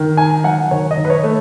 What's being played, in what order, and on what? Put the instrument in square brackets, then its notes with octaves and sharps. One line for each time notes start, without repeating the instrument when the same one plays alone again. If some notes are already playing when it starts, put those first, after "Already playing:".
Already playing: [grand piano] D#3
D#4 G#5
F#3 F#5
D#3 C#5
D#5
D#3
B4
C#5
A3